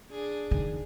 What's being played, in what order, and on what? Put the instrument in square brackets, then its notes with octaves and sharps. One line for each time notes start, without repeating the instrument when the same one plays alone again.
[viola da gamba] D4 G#4
[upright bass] D#3